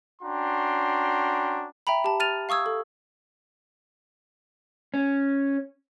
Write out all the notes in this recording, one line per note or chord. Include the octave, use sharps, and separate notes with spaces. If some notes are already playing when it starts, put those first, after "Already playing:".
C#4 D4 F#4 G5 A#5 C6
E5 G5 A#5 B5
G4 A5
F6 A6 D#7 F7
F5 C#6 D#6 E6 G#6
A4
C#4